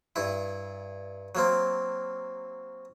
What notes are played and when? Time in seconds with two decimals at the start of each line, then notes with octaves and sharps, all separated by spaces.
0.16 G2 E4
1.35 F#3 A#3 C4